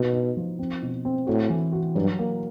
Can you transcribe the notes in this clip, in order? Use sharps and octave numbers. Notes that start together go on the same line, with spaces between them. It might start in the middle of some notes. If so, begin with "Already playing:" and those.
Already playing: B2 D#4
D#4
F3
C4
B2
C4
A2 F#4
E3
F#4
G2 F#3
A#3